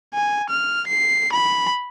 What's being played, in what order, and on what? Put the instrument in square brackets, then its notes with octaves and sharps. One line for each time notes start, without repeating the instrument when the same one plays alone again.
[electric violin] G#5
F6
C7
B5